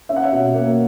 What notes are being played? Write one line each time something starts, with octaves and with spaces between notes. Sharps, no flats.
C#4 E5
F#5
C#5 E5
B2
A#3